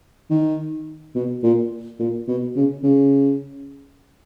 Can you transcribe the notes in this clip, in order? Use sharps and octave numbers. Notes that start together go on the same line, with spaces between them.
D#3
B2
A#2
A#2
B2
C#3
C#3